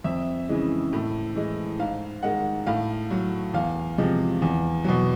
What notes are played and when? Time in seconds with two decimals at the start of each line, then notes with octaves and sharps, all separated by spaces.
0.04 F2 E5
0.49 C#3 E3 G#3
0.93 A2
1.35 E3 G#3
1.79 G#2 F5
2.23 D#3 G#3 F#5
2.67 A2 F5
3.11 F#3
3.54 E2 F5
3.98 C3 F3 G#3
4.42 E2
4.84 B2 F#3